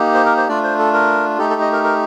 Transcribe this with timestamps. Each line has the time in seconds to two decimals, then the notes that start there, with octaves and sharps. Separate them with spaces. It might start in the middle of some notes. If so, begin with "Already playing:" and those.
Already playing: A#3 D#4 G4
0.14 C5
0.26 A#4
0.37 C5
0.48 A3 D4 F4 D5
0.63 C5
0.79 A4
0.93 A#4
1.38 A3 D#4 G4 A4
1.50 A4
1.61 D#5
1.73 A#4
1.84 A#4